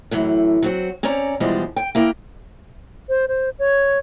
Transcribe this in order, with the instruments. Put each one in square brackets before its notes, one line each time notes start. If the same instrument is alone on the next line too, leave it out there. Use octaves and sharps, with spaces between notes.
[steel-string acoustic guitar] F#2 A2 E3 F#3
F#3 C4 F#4
C4 C#4 C#5 D5 A#5
B2 E3 F3 G3 G#3
G5
A#3 E4 A#4 G5
[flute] C5
C5
C#5